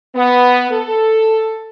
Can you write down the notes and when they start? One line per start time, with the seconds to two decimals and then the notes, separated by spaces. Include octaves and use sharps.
0.16 B3
0.72 A4